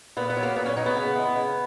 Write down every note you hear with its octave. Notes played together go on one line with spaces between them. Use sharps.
A#2 B3
B3
F#3
A#3
A#2 B3
C#4
F#3 D#4
B3
C#3
E3 G#3
C#3